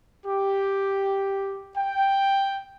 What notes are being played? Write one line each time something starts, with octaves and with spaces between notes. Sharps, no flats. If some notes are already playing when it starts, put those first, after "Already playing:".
G4
G5